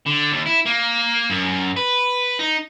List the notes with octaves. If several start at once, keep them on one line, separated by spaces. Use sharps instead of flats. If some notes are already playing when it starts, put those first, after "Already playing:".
D3
D#2
E4
A#3
F#2
B4
D#4